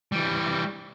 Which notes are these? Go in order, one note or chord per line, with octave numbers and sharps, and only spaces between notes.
E3 G3